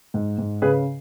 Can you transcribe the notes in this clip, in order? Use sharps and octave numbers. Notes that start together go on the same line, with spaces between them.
G#2
G#2
C#3 G#4 B4